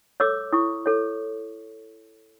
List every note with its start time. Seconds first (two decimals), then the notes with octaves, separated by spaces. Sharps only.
0.20 A4 C#5 D6 E6
0.53 E4 C#6 D#6
0.86 A4 C#5